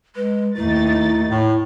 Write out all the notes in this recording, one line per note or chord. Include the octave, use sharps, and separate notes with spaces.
G#3 B4
D#2 A3 D#4 E4 A6
A2 C#5